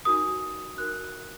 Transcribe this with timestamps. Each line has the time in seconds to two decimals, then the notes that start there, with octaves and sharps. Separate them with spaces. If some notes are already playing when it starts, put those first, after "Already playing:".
0.05 D#4 F#4 A#4 D#6
0.78 D#4 F#4 A#4 F#6